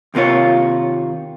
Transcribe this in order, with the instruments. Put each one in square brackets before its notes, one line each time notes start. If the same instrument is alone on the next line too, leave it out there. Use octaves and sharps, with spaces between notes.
[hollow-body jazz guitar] D#2 C3 A#3 F4 C#5